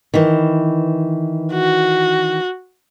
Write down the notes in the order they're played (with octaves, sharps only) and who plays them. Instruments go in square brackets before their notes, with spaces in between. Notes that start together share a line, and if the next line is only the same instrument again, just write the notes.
[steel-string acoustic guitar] D#3 E3
[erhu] F#4